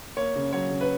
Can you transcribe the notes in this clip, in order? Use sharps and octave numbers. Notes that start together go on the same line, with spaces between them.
A#3 C#5
C#3
F#3 C#5
C#3
B4